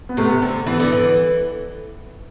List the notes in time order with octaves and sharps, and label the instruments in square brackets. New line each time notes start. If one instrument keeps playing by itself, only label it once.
[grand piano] B3
[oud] C3 [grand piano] A3
[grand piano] B3
[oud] D3
[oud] E3 [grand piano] B3
[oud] D3
E3